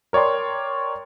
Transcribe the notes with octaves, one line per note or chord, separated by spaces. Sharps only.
A#4 C#5 D5 G5 C6